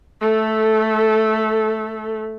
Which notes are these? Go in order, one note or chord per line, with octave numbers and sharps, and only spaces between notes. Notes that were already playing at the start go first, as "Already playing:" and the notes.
A3 A4